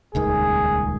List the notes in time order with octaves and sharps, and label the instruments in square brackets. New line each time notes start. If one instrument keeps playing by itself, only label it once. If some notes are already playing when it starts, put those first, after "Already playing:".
[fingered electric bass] D#1 C#2 D#3 [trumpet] G#4